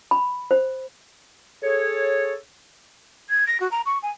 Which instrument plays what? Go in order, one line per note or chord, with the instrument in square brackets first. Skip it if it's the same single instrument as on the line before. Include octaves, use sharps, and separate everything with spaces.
[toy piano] B5
C5
[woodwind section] G#4 A4 C#5
[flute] G#6
A#6
F#4
A#5
C#6
G#5